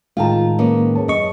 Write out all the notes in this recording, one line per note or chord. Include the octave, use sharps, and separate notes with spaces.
A2 D#3 G#3 F4 F5 G5 A5 A#5
A#3 B3 C#4
G#4 C#5 A5
F#2 D#5 C#6